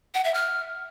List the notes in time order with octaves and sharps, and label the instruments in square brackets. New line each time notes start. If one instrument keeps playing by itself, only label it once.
[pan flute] F#5
E5
F6